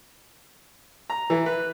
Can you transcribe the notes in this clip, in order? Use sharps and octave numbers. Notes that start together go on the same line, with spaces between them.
A#5
E3
B4